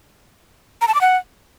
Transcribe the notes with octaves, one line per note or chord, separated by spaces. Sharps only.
A#5
A5
D6
F#5